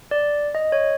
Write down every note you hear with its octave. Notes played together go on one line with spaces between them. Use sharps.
D5
D#5
C#5